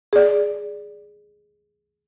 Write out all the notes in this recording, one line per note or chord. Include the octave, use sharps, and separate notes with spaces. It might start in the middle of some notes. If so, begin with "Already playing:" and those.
G#4 D5